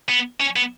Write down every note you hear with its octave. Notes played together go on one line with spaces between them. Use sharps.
B3
C#4
B3